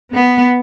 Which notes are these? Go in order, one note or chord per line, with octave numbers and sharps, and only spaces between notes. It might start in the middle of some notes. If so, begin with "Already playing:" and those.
B3